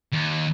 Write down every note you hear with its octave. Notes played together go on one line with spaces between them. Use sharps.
D#2